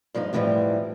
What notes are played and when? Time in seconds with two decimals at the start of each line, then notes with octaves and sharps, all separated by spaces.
0.15 G2 F3 G#3 D#4
0.33 F2 A2 E3 F3 G3